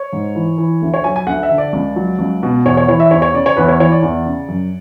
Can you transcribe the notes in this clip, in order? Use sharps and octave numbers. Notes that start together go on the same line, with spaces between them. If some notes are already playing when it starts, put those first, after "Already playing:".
Already playing: C#5
G#2
E3
E3
D2
C#5
F#3 G#5
G#5
D2 F#5
E5
D3
D5
C#2
F#3
C#2
B2
E2 C#5
C#5
E3 C#5
E5
E2 C#5
C#5
C#3 D5
C#5
E2 B4
C#5
E3 C#5
D5
E2
C#3
F#2